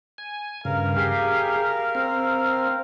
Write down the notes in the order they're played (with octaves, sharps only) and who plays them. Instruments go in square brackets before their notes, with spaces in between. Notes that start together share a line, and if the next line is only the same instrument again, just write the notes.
[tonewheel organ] G#5
[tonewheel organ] G2 C#3 [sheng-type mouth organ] A#4 F5
[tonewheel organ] G4 G#4
C4